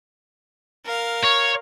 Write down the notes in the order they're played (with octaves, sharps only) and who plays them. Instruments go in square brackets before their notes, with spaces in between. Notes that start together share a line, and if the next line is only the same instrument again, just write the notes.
[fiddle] A#4 F5
[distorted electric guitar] C#5